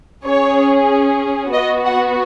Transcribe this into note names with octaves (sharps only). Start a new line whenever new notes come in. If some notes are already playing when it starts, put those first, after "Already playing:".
C#4 G#4 C#5
B3 F#4 D#5
F#5